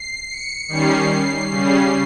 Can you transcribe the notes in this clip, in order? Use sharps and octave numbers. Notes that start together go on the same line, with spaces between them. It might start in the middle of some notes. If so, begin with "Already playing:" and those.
Already playing: C7
C#7
D#3 G3 C#4 C7
C#3 G3 C#4